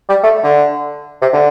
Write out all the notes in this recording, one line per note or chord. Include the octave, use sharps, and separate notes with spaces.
G3
A3
D3
C3
D3